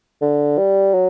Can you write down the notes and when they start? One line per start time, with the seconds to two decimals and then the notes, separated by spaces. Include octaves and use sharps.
0.22 D3
0.58 G3
0.94 F#3